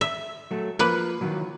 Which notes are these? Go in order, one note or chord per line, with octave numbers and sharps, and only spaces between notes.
E5
F#3 A3
F3 A#3 B4
D#3 E3 F#3